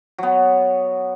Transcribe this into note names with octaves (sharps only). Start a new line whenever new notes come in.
F#3 B3